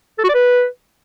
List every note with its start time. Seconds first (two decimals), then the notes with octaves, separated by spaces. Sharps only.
0.19 A4
0.24 F#4
0.29 D5
0.35 B4